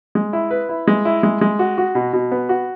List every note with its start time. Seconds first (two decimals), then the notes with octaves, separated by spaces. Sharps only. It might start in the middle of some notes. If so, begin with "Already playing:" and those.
0.15 G#3
0.33 E4
0.51 B4
0.69 E4
0.87 G#3
1.05 E4
1.23 G#3
1.41 G#3
1.59 F#4
1.78 F#4
1.95 B2
2.13 B2
2.32 B3
2.49 F#4